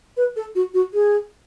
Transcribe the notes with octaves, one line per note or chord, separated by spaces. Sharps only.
B4
A4
F#4
F#4
G#4